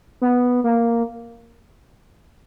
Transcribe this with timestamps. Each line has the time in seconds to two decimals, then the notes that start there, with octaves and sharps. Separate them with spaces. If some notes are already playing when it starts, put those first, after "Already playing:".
0.21 B3
0.64 A#3